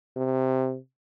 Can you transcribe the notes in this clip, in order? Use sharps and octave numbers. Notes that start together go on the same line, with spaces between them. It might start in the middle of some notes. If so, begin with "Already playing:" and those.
C3